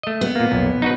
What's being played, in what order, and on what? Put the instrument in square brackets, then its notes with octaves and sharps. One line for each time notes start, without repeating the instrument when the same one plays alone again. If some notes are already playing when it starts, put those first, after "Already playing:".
[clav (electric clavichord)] A3 D#5
[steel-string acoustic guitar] B3
[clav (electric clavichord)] A#2 A#3
B1 F2 A#2
D#4 F#4 B4